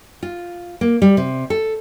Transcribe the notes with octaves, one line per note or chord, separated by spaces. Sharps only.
F4
A#3
G3
C3
A4